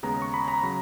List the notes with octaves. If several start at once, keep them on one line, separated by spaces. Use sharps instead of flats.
D#2 C#3 G#3 B3 A#5
C#6
B5
A#5
C#3 F#3